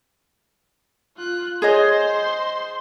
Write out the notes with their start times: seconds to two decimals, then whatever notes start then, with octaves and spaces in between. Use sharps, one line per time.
1.17 F4 F#6
1.62 G#4 C5 C#5 D#5 C6